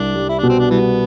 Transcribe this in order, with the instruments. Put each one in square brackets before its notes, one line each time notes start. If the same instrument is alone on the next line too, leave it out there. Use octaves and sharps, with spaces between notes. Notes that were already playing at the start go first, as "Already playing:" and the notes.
Already playing: [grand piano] C2 [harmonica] D4
[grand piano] G3
[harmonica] E4
[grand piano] B2 [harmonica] D4
[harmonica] C4
D4
[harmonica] E3 B3 [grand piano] G3